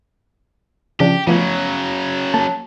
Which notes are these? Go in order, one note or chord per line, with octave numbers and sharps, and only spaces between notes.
C#3 F3 D4 G4
C#3 F3 F#3 A3 B3
A#3 A5